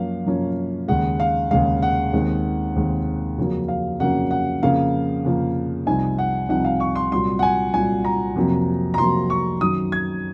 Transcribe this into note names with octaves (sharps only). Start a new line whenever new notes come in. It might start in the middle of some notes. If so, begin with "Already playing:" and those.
Already playing: F#2 F3 A#3 C#4 F5
F#2 F3 A#3 C#4
D#2 C#3 G#3 F#5
F5
D#2 C#3 G#3 F5
F#5
D#2 D#3 G#3 C4
D#2 D#3 G#3 C4
F2 C#3 F#3 A#3 C#4
F5
F2 C#3 F#3 A#3 C#4 F#5
F#5
F2 C#3 F3 A#3 F5
F2 C#3 F3 A#3
C2 C3 F3 C4 D#4 G#5
F#5
C2 C3 F3 C4 D#4 F#5
F5
C#6
C6
C2 A#2 F#3 C6
F#5
G#5
C2 A#2 F#3 G#5
A#5
F2 C3 F#3 A#3
A#5
F2 C3 F#3 A#3 C6
C#6
F#2 D#3 F#3 D#6
G#6